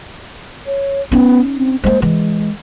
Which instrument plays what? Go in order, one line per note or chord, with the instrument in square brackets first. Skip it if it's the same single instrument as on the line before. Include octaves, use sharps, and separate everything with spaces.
[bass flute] C#5
[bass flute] B3 [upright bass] C#4 D#4
[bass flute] C4
[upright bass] G#3 A#3 [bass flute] C5
[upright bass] E3 [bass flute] G#3